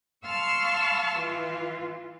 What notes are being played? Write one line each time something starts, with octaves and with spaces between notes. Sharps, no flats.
F5 A5 C6 C#6 E6 F6
E3 F4